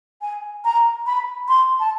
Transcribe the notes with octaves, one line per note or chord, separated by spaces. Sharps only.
G#5
A#5
B5
C6
A5